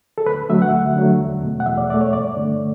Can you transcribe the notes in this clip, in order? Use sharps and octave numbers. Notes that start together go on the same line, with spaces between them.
A4
D2 B4
D3 F#3 A3 E5
F#5
D2
D3 F#3 A3
E2
B2 A3
F#5
E2 E5
D5
B2 A3 D5
C#5
G2 D5
D3 A3